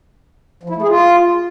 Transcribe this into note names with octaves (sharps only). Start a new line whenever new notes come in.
F3
E4
A3
G#4
F4